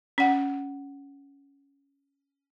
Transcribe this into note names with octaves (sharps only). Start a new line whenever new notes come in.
C#4 F#5